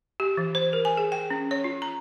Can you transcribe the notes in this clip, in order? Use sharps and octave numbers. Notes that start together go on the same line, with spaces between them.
G4
E3
C5
A#4
G#5
G#4
G5
C#4
C#5
F4
A#5